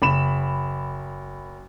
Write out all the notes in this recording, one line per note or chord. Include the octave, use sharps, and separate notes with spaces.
F#1 B5 E7